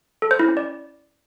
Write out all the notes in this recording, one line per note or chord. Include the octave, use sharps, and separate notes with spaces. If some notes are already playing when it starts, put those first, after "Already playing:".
A4
C5
E4
C#4
D5